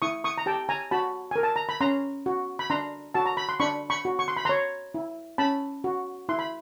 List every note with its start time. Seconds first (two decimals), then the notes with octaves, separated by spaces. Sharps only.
0.02 E4 C#6 D#6
0.24 C#6 D#6
0.38 A#5
0.46 G4 G5 A5
0.69 G#5 A#5
0.91 F#4 A5 B5
1.31 A#4 G#5
1.43 A5
1.56 A#5
1.69 B5
1.81 C#4 A#5 C6
2.26 F#4
2.59 B5
2.70 D4 A#5 C6
3.14 F#4 A5
3.26 A#5
3.37 B5
3.49 C6
3.60 D4 B5 C#6
3.90 B5 C#6
4.05 F#4
4.19 C#6
4.28 C6
4.37 B5
4.45 C#5 A#5 C6
4.94 E4
5.38 C#4 A5 B5
5.84 F#4
6.29 E4 C6
6.39 B5